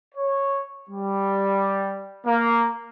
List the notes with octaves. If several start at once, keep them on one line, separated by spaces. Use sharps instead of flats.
C#5
G3
A#3